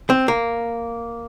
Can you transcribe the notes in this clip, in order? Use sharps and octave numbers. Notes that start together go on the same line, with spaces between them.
C4
A#3